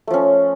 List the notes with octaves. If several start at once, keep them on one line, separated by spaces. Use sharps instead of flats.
F3 A3 C#4